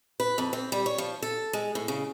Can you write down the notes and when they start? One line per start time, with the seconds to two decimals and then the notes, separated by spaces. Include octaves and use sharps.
0.20 B4
0.38 F2
0.53 C4
0.72 G3
0.86 C#5
0.98 F3
1.22 A4
1.53 G#3
1.75 A2
1.88 C#3